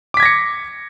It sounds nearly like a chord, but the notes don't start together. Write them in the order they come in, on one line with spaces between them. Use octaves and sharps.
D6 B6 G#6 A#6 C#7